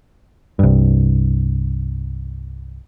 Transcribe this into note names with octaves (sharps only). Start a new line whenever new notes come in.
C2 G2